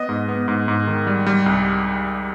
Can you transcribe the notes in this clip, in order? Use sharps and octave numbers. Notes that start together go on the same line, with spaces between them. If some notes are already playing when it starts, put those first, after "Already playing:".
Already playing: B3 D#5
G#2
B3
G#2
G#2
D#3
G3
G3
C2